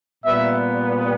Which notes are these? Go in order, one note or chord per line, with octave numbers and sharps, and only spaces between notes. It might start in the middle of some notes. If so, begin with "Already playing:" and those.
A#2 G3 B3 E5